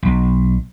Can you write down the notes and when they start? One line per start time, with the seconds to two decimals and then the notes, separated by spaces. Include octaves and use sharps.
0.03 B1